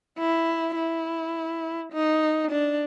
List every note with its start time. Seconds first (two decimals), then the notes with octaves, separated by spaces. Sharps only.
0.19 E4
0.76 E4
1.93 D#4
2.52 D4